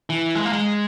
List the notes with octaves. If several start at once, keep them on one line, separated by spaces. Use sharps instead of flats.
E3
G#3
A#3
G#3